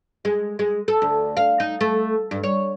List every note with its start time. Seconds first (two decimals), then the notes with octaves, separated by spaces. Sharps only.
0.25 G#3
0.59 G#3
0.88 A4
1.02 D2
1.37 F5
1.60 D#4
1.81 A3
2.31 G2
2.44 C#5